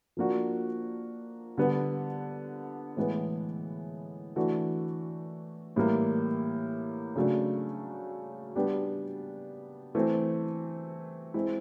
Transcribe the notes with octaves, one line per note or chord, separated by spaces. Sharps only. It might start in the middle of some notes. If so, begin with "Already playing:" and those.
F3 A#3 D4 F#4
D3 G3 B3
A2 E3 G#3 B3
E3 A3 D4 F#4
A2 E3 G3 A#3
C#3 F#3 A3 D4
G3 B3 D4 G4
E3 A3 C4
G#3 C4 E4